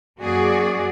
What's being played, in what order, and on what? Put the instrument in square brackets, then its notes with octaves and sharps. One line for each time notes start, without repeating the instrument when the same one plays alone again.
[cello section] F#2 A#3 F#4 G#4 D5